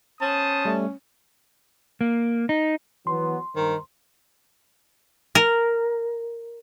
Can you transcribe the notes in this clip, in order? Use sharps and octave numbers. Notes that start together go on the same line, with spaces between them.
B3 C#4 C5 A5 D#6
G3 A3
A#3
D#4
E3 F#3 B3 C6
G2 D#3 C5 A#5
A#4